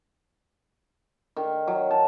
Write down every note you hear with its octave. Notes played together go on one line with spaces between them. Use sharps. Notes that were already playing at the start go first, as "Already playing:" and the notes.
D#3
F#3
A5